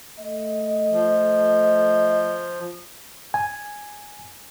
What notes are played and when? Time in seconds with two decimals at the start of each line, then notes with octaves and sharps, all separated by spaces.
0.19 A3 D#5
0.91 F3
3.34 G#5